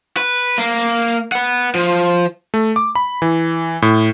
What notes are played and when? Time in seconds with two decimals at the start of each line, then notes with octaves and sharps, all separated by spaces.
0.17 B4
0.58 A#3
1.32 B4 F#5
1.75 F3
2.54 A3
2.76 D6
2.95 B5
3.22 E3
3.82 A2